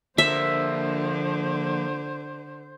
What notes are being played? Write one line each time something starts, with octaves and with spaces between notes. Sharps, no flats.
D3 F3 A#3 C5 E5